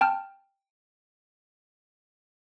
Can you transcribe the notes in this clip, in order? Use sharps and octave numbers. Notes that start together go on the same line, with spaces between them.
G5 A5 F6